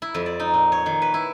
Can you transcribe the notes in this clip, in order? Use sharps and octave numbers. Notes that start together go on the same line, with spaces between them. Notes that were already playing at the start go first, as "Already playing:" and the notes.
E4
F2
D5
D#4
A#2
C#5
D#3
B4
E4